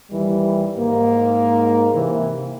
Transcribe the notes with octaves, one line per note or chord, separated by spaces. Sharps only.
D#2 E3 G3
G#2 A#3
C3 E3